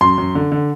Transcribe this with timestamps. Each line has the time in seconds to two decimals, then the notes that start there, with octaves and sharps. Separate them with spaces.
0.01 F#2 C6
0.18 F#2
0.35 D3
0.52 D3